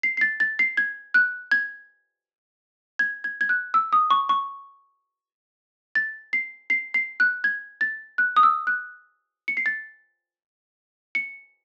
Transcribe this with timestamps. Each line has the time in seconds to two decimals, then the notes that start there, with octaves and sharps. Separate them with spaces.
0.03 C7
0.17 C7
0.21 A6
0.40 A6
0.59 C7
0.77 G#6
1.14 F#6
1.51 G#6
2.99 G#6
3.24 G#6
3.41 G#6
3.49 F#6
3.74 E6
3.93 D#6
4.11 C#6
4.29 C#6
5.95 A6
6.33 C7
6.70 C7
6.94 C7
7.20 F#6
7.44 G#6
7.81 A6
8.18 F#6
8.36 D#6
8.43 E6
8.67 F#6
9.48 C#7
9.57 C7
9.66 A6
11.15 C#7